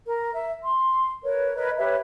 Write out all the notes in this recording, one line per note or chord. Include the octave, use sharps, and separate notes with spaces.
A#4
E5
C6
A#4 B4 C#5
A#4 B4 C#5 D#5
G4 B4 C#5 E5